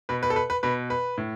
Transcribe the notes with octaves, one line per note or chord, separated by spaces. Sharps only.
B2 B4
B4
A4
B4
B4
B2 B4
B4
A2